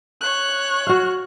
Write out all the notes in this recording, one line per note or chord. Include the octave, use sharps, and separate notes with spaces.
C#5 F#6
F#4 F5